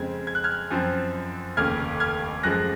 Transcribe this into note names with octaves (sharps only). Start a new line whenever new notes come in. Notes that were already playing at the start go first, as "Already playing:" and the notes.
Already playing: F2 C#3 G#3 C4 G#6
G#6
F#6
F6 G#6
F#2 F3 C4
F1 D#2 C#3 F6 G#6
F6 G#6
F#2 F3 G#3 F#6 A#6